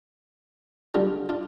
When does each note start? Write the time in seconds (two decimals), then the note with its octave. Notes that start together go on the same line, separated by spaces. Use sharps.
0.94 D3 G3 D4 F4
1.29 D4 F4